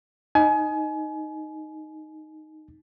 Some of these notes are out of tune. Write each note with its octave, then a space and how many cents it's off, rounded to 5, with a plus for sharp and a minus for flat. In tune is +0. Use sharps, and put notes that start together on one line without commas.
D#4 +0 G#5 +30